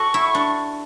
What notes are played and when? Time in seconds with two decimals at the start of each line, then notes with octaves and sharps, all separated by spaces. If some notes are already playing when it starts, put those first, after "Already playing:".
Already playing: F#4 A4 C#6
0.14 E4
0.35 D4